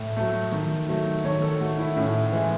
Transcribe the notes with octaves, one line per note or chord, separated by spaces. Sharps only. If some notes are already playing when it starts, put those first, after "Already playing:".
Already playing: A2
F#3 A3
D#3
F#3 A3
D#3 C#5
A4
A3 F#4
E4
A2 C#4
E3 G#3